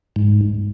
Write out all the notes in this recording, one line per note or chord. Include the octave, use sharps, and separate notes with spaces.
G#2